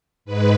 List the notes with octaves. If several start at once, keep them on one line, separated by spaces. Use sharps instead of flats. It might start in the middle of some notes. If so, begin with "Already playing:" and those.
G#2 G#3 B4